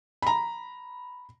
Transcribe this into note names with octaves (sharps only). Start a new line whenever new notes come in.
A#5 B5